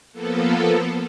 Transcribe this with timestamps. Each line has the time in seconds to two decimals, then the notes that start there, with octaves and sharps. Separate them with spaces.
0.13 F3 A#3 B3 A4